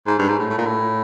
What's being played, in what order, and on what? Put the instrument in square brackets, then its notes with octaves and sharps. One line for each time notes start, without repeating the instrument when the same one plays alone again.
[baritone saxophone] G#2
G2
G#2
A2
A2
A#2
A2